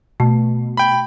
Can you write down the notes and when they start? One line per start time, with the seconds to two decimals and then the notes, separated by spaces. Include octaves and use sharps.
0.20 B2 A3
0.77 G5 B5